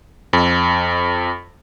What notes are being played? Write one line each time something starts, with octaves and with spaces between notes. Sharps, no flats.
F2